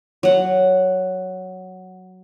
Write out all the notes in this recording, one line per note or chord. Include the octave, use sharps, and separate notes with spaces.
F#3 F#5